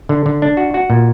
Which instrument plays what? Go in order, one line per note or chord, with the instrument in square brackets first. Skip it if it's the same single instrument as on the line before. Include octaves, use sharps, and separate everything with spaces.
[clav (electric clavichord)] D3
D3
D4
F#4
F#4
A#2